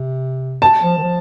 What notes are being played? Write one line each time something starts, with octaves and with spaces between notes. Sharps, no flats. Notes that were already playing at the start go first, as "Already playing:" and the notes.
Already playing: C3
A5
F3
D#3
F3